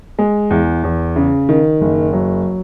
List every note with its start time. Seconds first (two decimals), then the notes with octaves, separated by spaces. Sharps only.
0.19 G#3
0.50 E2
0.83 E2
1.16 C#3
1.49 D#3
1.81 F#1
2.13 F#3